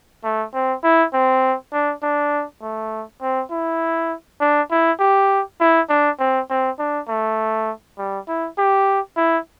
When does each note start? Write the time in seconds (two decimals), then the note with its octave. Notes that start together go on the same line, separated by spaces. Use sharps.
0.24 A3
0.53 C4
0.84 E4
1.13 C4
1.73 D4
2.03 D4
2.62 A3
3.22 C4
3.51 E4
4.41 D4
4.71 E4
5.00 G4
5.60 E4
5.89 D4
6.19 C4
6.50 C4
6.79 D4
7.08 A3
7.98 G3
8.28 E4
8.58 G4
9.17 E4